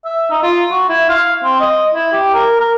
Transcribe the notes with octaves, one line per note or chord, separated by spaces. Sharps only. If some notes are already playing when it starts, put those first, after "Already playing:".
E5
D#4
F4
F#4
E4
F5
C4
D#5
E4
G4
A#4
A#4